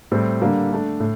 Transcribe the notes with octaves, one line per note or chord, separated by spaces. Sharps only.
A2 G3 C4
D3 G3 A#3
D3 A3 D4
A2